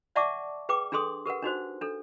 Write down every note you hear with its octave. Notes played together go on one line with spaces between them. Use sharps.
D5 E5 F#5 A5 C#6 D6
G#4 B4 G5 D6
D4 G#4 A4 C6 D#6
G4 A#4 B4 F#5
D4 D#4 F#4 C5
D4 A4